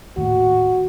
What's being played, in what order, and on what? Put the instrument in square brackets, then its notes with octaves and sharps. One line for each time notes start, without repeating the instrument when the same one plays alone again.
[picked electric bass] D#1 D#2 A2 [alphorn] F#4